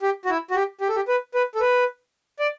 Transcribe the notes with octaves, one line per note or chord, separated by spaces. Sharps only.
G4
F#4
E4
F#4
G4
G4
A4
G4
B4
B4
A4
B4
D5